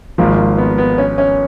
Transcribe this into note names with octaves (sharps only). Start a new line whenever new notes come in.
G#1 G#2 F3 A#3
A#3
B3
B3
C#4
C#4